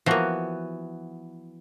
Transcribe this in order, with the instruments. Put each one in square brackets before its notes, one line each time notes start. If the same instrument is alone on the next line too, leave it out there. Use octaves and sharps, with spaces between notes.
[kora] E3 B3 F#4 [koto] F3 A#3